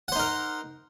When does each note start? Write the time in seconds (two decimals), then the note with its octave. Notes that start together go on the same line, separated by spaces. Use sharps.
0.08 F#5
0.12 C5
0.16 D#4
0.19 A#4